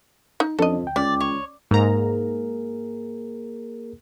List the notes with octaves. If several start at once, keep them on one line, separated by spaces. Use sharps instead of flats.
D#4
F2 F3 C#4 D4 A4 D#5
D2 G5
C#2 C#4 D5
C#5
G#2 A#3 G#4 A#4 A#5